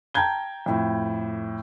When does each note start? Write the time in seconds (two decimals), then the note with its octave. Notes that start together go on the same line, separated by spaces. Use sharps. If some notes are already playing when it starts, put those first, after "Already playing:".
0.14 G5 A5 A#5 G6 G#6 G7
0.66 F2 A2